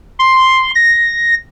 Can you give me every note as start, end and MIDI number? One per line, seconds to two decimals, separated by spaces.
0.19 0.71 84
0.75 1.34 94